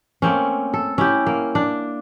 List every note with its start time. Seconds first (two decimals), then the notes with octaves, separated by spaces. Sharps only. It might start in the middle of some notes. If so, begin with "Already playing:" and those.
0.22 A3 A#3 C4 C#4
0.74 A4
0.98 C#4 E4 G4
1.27 A#3
1.55 D4